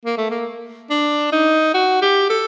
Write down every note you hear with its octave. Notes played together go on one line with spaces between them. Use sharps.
A#3
A3
A#3
D4
D#4
F#4
G4
A4